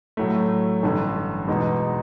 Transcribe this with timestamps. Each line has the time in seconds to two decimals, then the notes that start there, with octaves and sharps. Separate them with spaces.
0.17 A2 F#3 A3
0.83 A1 G2 D3
1.48 E2 B2 G#3 B3 D#4